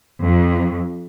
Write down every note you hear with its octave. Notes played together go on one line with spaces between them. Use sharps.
F2